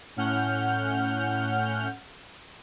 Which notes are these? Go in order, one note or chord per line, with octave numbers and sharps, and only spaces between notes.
A2 C#4 F#5 F6 G6